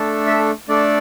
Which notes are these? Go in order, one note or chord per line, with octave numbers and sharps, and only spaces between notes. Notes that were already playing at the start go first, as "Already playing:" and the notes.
Already playing: A3 D4 A4
E5
A3 D4 A4 D5